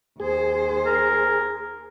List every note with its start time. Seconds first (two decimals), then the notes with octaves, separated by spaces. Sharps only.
0.20 D#2 G#4 C5
0.86 A#4